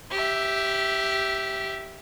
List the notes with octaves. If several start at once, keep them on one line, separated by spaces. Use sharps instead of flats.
G4 E5